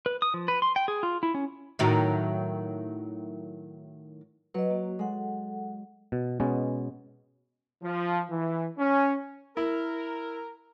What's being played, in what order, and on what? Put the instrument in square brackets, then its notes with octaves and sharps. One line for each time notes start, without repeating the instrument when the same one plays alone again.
[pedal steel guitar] B4
D#6
F3
B4
C6
G5
G#4
F4
E4
C#4
[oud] A2 D#3 F#3
[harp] F#3 [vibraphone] B4 D#5
[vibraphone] A#3 F#4
[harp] G#3 [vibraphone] A4 F#5
[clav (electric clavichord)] B2
B2 G#3 B3 C#4
[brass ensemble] F3
E3
C#4
[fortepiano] E4 [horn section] A#4